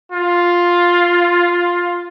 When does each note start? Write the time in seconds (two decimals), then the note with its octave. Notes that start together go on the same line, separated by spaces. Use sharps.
0.12 F4